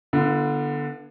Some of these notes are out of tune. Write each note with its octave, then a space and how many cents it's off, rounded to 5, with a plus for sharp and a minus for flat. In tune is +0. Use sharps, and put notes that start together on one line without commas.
D3 +0 B3 -25 F4 -45